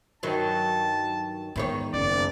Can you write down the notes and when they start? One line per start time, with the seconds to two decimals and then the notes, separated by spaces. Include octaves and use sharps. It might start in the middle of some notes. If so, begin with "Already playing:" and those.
0.23 G2 D#3 F#3 A5
1.56 E2 G#2 D#3 C#5
1.94 F#1 D5